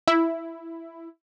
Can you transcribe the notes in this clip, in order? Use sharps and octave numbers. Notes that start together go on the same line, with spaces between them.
E4